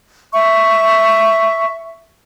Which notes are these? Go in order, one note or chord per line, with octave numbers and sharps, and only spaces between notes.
E5 C#6